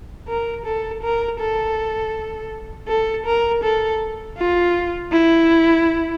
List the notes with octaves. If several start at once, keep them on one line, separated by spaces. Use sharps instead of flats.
A#4
A4
A#4
A4
A4
A#4
A4
F4
E4